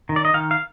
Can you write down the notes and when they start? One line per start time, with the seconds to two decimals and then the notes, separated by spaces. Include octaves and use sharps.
0.09 D#3
0.16 D5
0.25 D#5
0.34 D#3 F5
0.51 F5